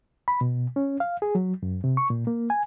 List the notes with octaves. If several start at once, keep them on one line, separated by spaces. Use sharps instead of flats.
B5
B2
C#4
F5
G#4
F#3
F#2
C3
C#6
A#2
A#3
G#5